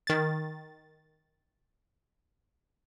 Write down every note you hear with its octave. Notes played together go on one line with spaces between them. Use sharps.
D#3 A6